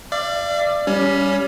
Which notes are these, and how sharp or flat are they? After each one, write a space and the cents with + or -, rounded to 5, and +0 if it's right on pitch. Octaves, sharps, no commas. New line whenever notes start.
D5 +15 F5 -40
G3 +0 C#4 +20